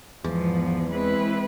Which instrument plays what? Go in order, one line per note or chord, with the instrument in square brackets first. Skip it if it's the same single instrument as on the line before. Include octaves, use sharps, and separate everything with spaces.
[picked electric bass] E2 [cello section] G#2 F3 B3
[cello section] E3 G#3 C4 E4 B4